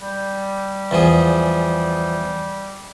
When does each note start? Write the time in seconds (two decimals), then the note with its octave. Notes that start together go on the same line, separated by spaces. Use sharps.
0.01 G3
0.91 E2 F3 G#4